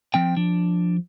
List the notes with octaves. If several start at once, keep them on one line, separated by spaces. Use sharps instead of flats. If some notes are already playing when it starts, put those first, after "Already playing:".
F3 C4 G5
F3 D4